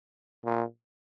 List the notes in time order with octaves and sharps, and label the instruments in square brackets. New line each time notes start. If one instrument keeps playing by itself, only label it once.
[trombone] A#2